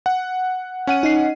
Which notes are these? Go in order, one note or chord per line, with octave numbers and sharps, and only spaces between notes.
F#5
C#4 F#5 D#7
D#4 D#5 C7